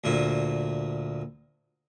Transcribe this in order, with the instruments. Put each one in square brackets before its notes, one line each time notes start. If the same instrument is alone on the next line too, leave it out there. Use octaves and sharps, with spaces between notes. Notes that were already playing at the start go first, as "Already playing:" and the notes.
[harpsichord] D2 A#2 E4